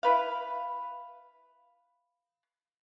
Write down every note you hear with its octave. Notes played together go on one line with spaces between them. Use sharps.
E4 B4 F5